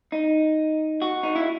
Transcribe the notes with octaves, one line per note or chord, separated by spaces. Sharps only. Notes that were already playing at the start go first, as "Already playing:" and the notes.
D#4
F#4
D#4
E4